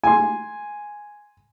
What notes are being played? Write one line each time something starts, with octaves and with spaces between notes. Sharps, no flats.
G#5 C6